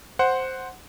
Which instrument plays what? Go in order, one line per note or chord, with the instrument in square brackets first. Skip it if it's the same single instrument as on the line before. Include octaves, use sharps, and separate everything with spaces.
[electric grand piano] C5 F#5